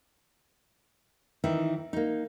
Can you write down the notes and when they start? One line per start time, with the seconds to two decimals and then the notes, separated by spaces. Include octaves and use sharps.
1.44 D#3 E3 D#4 E4
1.93 A#3 D#4